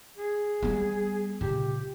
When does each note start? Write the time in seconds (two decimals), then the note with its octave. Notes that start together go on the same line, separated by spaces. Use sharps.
0.17 G#4
0.63 G3 B3
1.41 A#2 C#3 G4